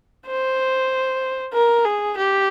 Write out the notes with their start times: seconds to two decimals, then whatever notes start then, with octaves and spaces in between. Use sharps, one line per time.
0.27 C5
1.53 A#4
1.85 G#4
2.18 G4